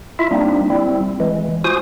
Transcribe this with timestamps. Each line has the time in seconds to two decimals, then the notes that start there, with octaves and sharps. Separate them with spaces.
0.19 E4 F4 E5
0.31 G3 A#3 C4 D4 D#4
0.70 G3 C4 E4
1.20 E3 G#3
1.64 F4 F#4 C5 G#5 D#6